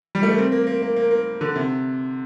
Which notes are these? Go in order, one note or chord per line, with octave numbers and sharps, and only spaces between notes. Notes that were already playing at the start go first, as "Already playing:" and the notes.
G3
A3
A#3
C4
A#3
A#3
A#3
A#3
A#3
D3
C3